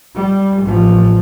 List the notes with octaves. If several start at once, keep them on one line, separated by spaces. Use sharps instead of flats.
G3
A1 F3